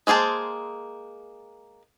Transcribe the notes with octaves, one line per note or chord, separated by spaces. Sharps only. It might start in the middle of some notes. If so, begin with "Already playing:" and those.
G#3 A#3 G#4 C5 A5